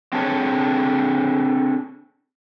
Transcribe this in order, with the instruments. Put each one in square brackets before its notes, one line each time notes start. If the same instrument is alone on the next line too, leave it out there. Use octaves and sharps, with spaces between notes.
[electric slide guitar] C4 D4 G#4 A4 C#5